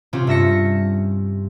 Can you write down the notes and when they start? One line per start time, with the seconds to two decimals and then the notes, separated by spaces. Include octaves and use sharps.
0.13 C3 C4 C#4 F4
0.27 G2 E5 A#6 C#7